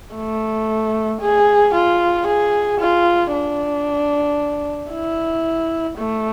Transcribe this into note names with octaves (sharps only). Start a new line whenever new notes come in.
A3
G#4
F4
G#4
F4
D4
E4
A3